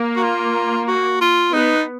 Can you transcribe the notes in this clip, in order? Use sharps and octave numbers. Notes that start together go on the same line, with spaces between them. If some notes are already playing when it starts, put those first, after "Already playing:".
Already playing: A#3
F#4
F4
F#4
F4
B3 D#4